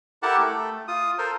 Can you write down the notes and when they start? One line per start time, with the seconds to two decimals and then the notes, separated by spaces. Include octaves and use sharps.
0.23 E4 G4 A4 A#4 F#5 A5
0.39 A3 A4
0.88 F4 D#6
1.18 A4 A#4 C5